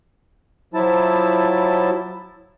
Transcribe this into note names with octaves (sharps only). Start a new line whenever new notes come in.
F3 F#3 E4 A5